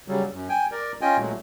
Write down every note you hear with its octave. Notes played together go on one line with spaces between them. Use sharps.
C#3 F#3 G3
F#2
G5 G#5
A#4 D5
C#4 F4 D#5 G5 G#5
A#2 F#3 G#3 A3